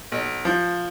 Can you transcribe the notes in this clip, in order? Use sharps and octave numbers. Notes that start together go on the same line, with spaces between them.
B1
F3